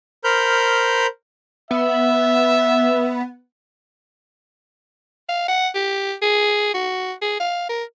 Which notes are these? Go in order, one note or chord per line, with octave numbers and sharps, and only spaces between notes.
A#4 C5 B5 F6 G6
B3 E5
F5
F#5
G4
G#4
F#4
G#4
F5
A#4